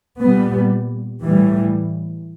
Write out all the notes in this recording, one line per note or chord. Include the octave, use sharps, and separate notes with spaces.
A#2 G3 B3
A2 E3 G3